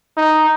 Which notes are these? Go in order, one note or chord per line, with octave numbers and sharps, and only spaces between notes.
D#4